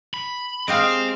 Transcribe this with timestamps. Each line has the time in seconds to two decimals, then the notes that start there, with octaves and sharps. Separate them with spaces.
0.14 B5
0.68 G#3 C4 G4 D#5 F5